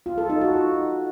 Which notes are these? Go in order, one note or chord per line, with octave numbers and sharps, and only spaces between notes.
F4
A4
D#4
F#4